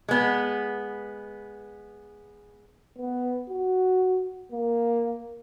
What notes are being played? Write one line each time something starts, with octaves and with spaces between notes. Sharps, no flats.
G#3 B3
B3
F#4
A#3